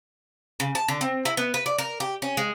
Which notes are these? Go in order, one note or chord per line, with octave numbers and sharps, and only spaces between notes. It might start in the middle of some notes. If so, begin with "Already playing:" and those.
C#3
A5
D3
C4
E4
B3
B4
D5
A#4
G4
C#4
G#3